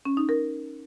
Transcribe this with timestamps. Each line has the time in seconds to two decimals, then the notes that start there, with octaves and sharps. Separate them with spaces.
0.05 C#4
0.17 D#4
0.29 A#4